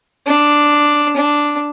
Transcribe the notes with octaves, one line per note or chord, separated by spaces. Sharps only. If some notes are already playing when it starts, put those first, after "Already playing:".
D4
D4